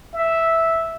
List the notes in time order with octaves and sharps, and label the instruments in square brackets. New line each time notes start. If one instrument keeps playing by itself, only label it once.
[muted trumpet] E5